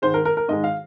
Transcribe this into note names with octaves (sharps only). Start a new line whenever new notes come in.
G#2 D#3 G#3 C5
A#4
A#4
A#4
G#2 D#3 G#3 D#5
F5